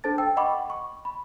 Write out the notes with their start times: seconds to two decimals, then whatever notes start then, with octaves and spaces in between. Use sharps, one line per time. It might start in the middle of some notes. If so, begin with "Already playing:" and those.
0.04 D4 A4 C5 A5 A6
0.18 G5 E6
0.37 D#5 F#5 G5 B5 C#6 D6
0.70 C#6
1.05 B5